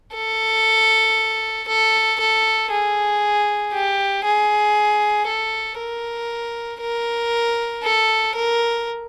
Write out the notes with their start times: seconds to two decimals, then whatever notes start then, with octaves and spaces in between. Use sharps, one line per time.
0.15 A4
1.68 A4
2.19 A4
2.71 G#4
3.73 G4
4.25 G#4
5.28 A4
5.79 A#4
6.81 A#4
7.83 A4
8.35 A#4